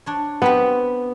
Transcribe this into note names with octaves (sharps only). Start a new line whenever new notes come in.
D4 C#5
B3 C4 G4 B4